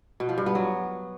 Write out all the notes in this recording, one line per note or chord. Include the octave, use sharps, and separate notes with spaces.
B2
F3
G2
B3
F#3